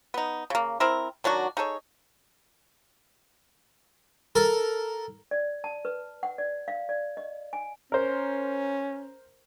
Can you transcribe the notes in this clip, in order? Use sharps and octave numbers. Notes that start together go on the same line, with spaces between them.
B3 D#4
C#3 A#3
C4 E4 A#4
D#3 F#3 D4 F#4
D#4 G#4 A4 C#5
A4 A#4
D5
A5
B4
F#5
D5
F5
D5
D#5
G#5
C#4 A#4 C5